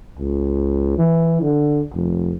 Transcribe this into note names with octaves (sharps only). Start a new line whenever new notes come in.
C#2
E3
D3
F1